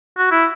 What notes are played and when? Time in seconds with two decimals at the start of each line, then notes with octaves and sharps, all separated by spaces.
0.18 F#4
0.31 E4